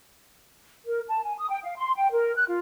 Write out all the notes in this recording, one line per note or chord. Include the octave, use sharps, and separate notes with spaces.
A#4
A5
G#5
D#6
G5
F5
C6
G5
A#4
F#6
F4